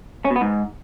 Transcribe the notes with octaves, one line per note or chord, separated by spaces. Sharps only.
C#4
B2
B3
G#2